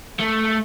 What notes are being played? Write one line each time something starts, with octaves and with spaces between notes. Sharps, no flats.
A3